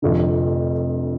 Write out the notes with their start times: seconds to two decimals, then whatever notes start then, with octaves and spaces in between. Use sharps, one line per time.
0.02 F1 F2 D3